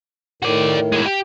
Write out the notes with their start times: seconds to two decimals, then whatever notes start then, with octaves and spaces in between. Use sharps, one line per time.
0.42 A2 D#3 F#4 D5
0.92 E3 G#3
1.06 G4